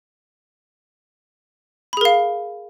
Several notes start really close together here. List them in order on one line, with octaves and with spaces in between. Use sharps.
B5 G#4 A#4 F5